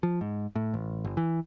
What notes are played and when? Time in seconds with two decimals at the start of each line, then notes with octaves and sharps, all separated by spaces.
0.03 F3
0.21 G#2
0.55 A2
0.74 A1
1.04 G1
1.17 E3